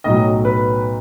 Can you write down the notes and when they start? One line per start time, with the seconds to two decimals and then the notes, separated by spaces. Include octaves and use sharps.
0.04 B1 A2 F#3 D#5
0.45 B4